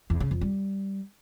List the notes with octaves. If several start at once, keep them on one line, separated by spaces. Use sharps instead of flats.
E2
C#3
F2
G3